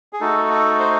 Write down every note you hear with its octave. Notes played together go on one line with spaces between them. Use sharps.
G#4
A3 D#4 F#4 A4
A4
C5